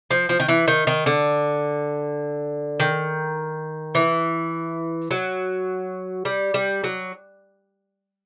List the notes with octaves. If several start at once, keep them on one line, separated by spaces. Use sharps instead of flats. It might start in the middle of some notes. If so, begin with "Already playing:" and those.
F3
F3
D#3
E3
D#3
D#3
D3
D#3
E3
F#3
G3
G3
F#3